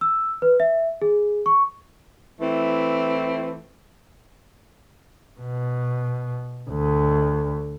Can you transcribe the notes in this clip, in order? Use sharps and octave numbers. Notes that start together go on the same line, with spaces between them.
E6
B4
E5
G#4
C#6
E3 A3 C4 E4
B2
D2